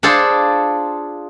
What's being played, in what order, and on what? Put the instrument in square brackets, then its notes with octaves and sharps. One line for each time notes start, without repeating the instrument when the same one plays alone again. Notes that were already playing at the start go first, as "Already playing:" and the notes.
[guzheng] D4 F4 G#4 A4 C5